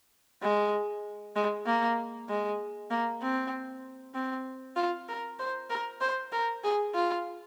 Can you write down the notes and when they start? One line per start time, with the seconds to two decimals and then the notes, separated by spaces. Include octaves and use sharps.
0.42 G#3
1.36 G#3
1.66 A#3
2.29 G#3
2.91 A#3
3.21 C4
4.15 C4
4.76 F4
5.08 A#4
5.39 C5
5.70 A#4
6.01 C5
6.32 A#4
6.63 G#4
6.94 F4